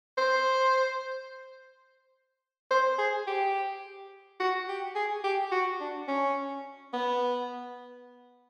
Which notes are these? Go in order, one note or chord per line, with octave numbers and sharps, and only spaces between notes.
C5
C5
G#4
G4
F#4
G4
G#4
G4
F#4
D4
C#4
B3